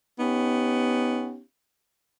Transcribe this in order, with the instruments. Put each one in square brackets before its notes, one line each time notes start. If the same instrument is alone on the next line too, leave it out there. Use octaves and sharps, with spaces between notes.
[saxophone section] B3 C#4 D#4 G4